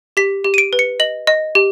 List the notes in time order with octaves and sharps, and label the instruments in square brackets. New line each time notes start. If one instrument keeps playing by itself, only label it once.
[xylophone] G4 B6
G4
D#7
D7
B4
C#7
D#5 F#7
D#5
G4